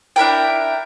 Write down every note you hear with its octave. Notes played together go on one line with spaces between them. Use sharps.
D4 E4 A#4 G5